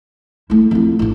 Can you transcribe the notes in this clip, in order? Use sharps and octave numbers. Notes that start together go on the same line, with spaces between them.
A3 E4
F2 E4
A1 D4